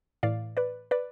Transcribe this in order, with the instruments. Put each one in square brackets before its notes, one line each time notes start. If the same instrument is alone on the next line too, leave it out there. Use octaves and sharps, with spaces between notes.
[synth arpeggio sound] A2 E3 D5 F5
B4 D5
B4 D5